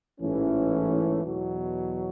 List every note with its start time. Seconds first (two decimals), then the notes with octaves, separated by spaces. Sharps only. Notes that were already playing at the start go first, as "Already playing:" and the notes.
0.21 A1 G#2 E3 A3 C#4
1.25 E2 B2 F#3